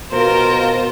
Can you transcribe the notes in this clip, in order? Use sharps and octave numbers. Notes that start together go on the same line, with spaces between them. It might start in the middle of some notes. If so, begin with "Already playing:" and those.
B2 F4 A#4 C5